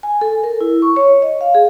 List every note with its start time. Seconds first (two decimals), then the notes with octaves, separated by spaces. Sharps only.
0.03 G#5
0.21 A4
0.44 A#4
0.61 E4
0.82 C#6
0.96 C#5
1.22 D#5
1.41 F5
1.55 G#4